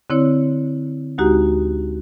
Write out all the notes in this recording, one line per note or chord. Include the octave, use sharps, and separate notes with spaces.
D3 C4 E4 C#5
D2 G#3 D#4 F#4 G4 A#5